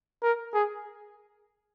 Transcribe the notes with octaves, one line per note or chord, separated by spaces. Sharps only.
A#4
G#4